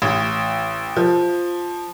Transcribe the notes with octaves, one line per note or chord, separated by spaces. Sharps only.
A1
F3